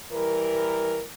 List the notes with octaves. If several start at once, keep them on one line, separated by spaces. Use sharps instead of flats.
E3 G3 A#4